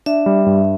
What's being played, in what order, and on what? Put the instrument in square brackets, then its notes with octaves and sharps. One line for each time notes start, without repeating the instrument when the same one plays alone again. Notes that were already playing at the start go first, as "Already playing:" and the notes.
[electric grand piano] D4 [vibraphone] E5
[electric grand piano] G3
G2